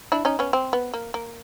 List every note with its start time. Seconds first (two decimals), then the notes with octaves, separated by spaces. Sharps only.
0.12 D4 E4
0.25 C#4 D#4
0.39 B3 C#4
0.53 C4
0.73 B3
0.94 A#3
1.14 A#3